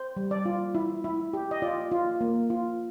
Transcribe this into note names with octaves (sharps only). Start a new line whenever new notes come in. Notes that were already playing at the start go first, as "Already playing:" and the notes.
Already playing: C5
G3
D5
F4
E4
E4
G4
D#5
F4 D5
F4
A#3
F4